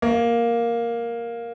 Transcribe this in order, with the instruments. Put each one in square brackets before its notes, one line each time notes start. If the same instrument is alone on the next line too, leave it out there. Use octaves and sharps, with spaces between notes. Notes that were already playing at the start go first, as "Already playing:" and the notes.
[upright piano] A#3